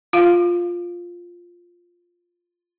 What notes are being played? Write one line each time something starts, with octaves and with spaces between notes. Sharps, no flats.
F4 F5